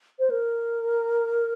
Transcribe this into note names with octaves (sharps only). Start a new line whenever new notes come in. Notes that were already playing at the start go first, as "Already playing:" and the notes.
C5
A#4